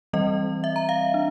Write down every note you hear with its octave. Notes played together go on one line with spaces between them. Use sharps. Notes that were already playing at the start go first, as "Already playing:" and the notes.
E3 G3 C4 D#5
E5
A#5
F5
D4